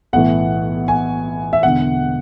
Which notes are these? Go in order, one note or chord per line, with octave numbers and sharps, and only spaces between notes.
B1 A2 E3 F#5
G#5
E5
E1 E2 D3 F#5